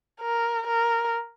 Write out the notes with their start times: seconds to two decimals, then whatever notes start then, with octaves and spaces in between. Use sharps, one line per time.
0.21 A#4
0.67 A#4